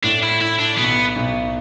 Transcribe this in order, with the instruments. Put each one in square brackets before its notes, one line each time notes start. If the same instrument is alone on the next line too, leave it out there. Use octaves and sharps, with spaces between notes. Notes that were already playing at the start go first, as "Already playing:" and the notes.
[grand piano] A2 [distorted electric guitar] D4
[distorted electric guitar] E4
E4
D4
[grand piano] B1 B2 [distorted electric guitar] B3
[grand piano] B1 B2